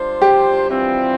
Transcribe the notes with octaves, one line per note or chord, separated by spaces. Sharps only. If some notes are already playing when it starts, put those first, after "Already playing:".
Already playing: G3 D4 F4 C5
G4
G2 E3 G3 C4 F4